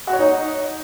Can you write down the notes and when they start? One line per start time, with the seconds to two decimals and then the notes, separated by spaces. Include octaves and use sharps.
0.07 F#4
0.13 C#5
0.19 D#4